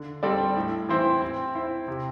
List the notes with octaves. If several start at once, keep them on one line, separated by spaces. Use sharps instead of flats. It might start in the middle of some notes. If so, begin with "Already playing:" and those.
Already playing: D3
G3 C4 A4 D5
A2
E3 C4 E4 C5
C4
E4 C5 E5
C3